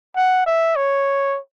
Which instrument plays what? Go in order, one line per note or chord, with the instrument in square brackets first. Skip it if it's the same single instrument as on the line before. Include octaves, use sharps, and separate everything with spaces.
[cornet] F#5
E5
C#5